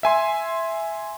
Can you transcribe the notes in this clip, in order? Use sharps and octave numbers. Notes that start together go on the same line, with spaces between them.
E5 G#5 C6